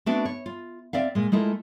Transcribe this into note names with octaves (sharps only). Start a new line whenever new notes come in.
A3 B3 C4 D4 F#4
C#5
F4
C4 D5 E5 F5
A#2 G#3
G#3 A3 E4 F4 A#4